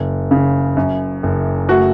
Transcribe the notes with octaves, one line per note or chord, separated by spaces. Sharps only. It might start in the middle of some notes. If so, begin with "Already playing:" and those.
Already playing: F#1
C#3
F#2
F#1
A3 F#4